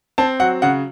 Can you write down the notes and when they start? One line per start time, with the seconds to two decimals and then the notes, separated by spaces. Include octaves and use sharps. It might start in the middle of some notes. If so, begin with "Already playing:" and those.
0.18 C4 A5
0.40 F#3 F#5
0.62 C#3 F#5